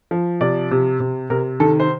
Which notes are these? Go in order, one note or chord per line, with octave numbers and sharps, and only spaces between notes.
F3
C3 D5
C3
C3
C3 A#4
D#3 A4
C5